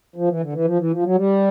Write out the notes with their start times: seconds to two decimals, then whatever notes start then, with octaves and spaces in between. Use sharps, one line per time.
0.16 F3
0.29 E3
0.41 D3
0.53 E3
0.65 F3
0.78 E3
0.91 F3
1.03 F#3
1.15 G3